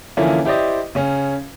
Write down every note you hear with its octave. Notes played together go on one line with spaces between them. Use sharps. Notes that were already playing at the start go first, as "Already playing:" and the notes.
D3 E3 F3 A#3 C#4 E4
E4 G4 C5 D5 D#5
C#3 C#4